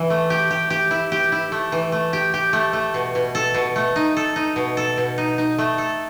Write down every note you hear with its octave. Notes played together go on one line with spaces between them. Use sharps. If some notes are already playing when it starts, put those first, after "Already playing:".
Already playing: E3 E4
A3
G4
G4
G4
E4
G4
E4
A3
E3
A3
G4
G4
A3
A3
B2
B2
A4
B2
A3
D#4
A4
D#4
B2
A4
B2
D#4
D#4
A3
A4